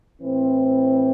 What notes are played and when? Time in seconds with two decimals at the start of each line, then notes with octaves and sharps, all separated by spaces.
0.21 A2 E3 C4